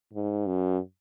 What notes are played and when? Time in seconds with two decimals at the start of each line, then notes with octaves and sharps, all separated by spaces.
0.14 G#2
0.47 F#2